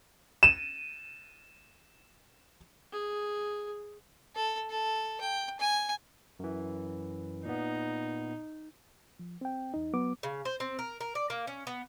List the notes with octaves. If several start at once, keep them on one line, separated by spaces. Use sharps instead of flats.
D#7 E7
G#4
A4
A4
G5
G#5
F#2 E3
A#2 B3 D#4
F3
C4 G5
E2 D#4
F#3 B3 D6
C#3
C5
C4
A#4
A#4
D5
A#3
C#4
B3